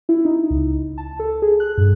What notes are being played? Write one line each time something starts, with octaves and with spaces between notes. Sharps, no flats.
E4
D#4
C#2
A5
A4
G#4
F#6
G2